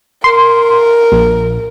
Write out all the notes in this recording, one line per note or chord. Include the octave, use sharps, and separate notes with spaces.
A#4 C6
A#1